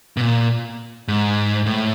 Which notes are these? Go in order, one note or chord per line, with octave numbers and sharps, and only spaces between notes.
B2
A#2
G#2
A2